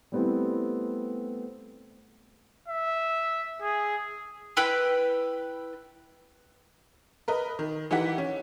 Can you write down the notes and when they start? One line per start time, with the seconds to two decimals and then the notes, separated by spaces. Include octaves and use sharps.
0.12 G3 A3 B3 C4 E4
2.68 E5
3.62 G#4
4.57 E4 B4 G5 B5
7.28 A#4 B4 D#5
7.59 D#3
7.91 E3 D#4 E4 G4 F#5 B6
8.18 C#4